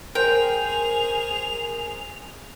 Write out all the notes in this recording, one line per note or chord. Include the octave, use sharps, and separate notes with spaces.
G#4 A#4 C5 G5 F7